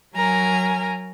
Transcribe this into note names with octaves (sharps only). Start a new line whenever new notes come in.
F#3 A#4 G#5 A#5